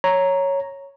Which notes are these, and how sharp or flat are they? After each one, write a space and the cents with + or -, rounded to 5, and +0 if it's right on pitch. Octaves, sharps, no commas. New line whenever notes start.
C#5 +0 A#5 +0